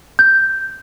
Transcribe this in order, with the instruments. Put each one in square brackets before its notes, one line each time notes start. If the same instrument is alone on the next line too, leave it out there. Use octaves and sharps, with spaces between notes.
[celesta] G6